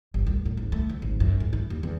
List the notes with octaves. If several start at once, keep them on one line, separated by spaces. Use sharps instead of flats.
G1
D2
A2
G#1
A3
D2
G#1
F#2
G#2
E4
D#2
E2